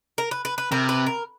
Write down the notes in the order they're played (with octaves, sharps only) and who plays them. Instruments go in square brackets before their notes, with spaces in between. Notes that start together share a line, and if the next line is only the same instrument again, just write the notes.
[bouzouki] A#4
B4
B4
B4
[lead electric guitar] C3 [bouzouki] A#4
[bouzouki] B4
A#4